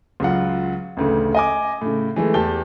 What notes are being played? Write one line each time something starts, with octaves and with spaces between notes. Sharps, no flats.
C#2 F#3 F4 F#5
A1 D2 C#3
D#5 G#5 D6
A2 C#3
E3 G#3 A3
E2 G4 A5 G7